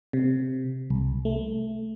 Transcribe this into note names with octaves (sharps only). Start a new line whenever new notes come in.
C3
C2
A3